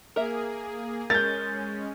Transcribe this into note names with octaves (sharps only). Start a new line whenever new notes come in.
A#3 G#4 A#4 E5
G#3 C#4 A#4 G6 A6